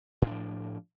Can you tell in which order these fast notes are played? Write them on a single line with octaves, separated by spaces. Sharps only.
A2 D4 F3